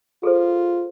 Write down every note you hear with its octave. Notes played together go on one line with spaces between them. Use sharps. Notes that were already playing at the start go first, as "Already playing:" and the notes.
F4 G#4 A4 C5